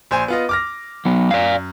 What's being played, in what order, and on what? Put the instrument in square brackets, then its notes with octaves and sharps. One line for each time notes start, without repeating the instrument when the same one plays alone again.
[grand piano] A#1 C5 G#5
B3 F4 D#5
D6 F6 A#6
[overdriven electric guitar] F#3 B3
[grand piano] F#2 [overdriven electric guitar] D5 F5